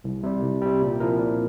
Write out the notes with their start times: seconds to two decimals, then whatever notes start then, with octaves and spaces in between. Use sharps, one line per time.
0.04 C2
0.23 C3 G3
0.43 C2
0.62 C3 G3
0.81 A#2
1.00 F3 C4 E4 A#4
1.19 A#2